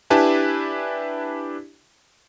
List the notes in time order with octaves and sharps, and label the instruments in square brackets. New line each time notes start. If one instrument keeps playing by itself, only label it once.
[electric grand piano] D4 E4 G4 B4 G#5 A5